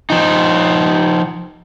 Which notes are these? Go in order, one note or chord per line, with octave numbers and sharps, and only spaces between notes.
F3 D#4